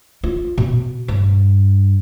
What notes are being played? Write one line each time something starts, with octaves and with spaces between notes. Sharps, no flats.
F4
B2
G2